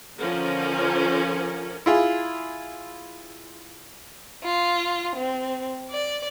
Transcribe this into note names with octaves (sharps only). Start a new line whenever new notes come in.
D3 F3 C#4 A#4
E4 F4 G#4
F4
C4
D5